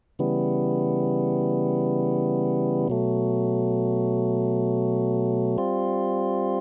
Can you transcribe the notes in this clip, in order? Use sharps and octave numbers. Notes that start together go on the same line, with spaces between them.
C#3 E3 G3 B3
B2 F#3 A3
G3 C4 F4